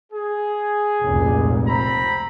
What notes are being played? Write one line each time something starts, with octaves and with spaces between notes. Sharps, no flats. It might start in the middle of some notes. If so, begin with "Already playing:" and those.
G#4
F1 C#2 A#2
C4 A#5 B5